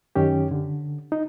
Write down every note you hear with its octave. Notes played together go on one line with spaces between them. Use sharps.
F#2 D#3 C#4 G4
D3
D#4